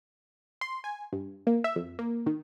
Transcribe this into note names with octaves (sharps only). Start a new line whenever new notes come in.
C6
G#5
G2
A#3
E5
F2
A#3
D#3